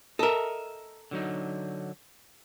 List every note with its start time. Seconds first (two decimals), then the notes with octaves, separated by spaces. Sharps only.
0.19 A4 A#4 D#5 E5
1.11 D3 F#3 D#4